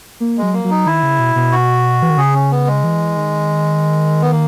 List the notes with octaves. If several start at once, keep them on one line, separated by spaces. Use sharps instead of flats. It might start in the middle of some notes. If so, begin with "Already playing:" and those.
A#3
G#3
F#3
A#3
F#3
D#4
D#3 E4
C#3
B2
B2
F#4
E3
D#3
C#3 G#4
C#4
B3
G#3
E3
D#3
B3
A#3